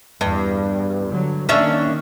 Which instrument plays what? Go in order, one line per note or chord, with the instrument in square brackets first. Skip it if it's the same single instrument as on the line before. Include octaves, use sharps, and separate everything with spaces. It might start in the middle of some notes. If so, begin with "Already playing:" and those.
[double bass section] E2 [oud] G2
[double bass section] D3 F#3
[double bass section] D#3 A#3 [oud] C#4 D4 E5